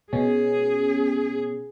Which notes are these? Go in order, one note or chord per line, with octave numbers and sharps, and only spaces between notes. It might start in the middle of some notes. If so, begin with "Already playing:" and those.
B2 C#4 G#4